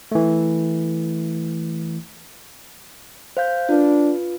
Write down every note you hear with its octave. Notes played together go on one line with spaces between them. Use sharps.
E3 A3
C5 F5 G6
D4 F4 B4